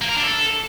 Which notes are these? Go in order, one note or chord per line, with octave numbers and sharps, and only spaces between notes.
A#3
A#4
D4
A4